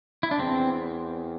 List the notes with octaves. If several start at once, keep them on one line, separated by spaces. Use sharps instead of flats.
E4
D4
E2 C4